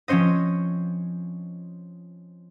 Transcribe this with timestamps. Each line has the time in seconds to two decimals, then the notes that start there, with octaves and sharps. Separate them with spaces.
0.08 F3 C4 C#4 C5 D#5